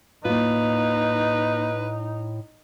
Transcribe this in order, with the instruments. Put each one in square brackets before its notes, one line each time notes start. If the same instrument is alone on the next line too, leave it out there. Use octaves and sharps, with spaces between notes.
[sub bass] A2 [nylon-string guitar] A#3 F4 [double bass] D#4 [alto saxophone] B4